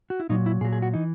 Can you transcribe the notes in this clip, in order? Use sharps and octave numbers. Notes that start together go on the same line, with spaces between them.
F#4
E4
A#2 F#3 D#4
E4
A#2 F#3 G#4
G#4
F#4
E3 D#4